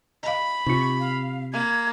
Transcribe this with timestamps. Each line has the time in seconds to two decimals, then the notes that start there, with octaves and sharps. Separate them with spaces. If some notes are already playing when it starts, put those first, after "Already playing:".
0.23 D#5 F5 B5
0.67 C3 D#4 F4 C#6
0.99 F5
1.53 A#3 G#6